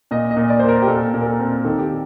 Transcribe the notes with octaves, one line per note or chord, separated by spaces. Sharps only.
A#2 D#5
D#5
A#2
D5
A#3 C5
A#4
G4
A#2 A4
A#2
A#4
A4
C4
D#3 A4
G4